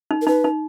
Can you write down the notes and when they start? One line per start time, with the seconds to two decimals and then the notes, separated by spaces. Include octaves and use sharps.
0.11 D#4
0.22 A#4
0.27 D#4 B4
0.44 D#4